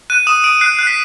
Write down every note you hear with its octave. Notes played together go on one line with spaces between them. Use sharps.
F#6 D#7
D#6 E7
D#6 D7
F#6 C7
F#6
B6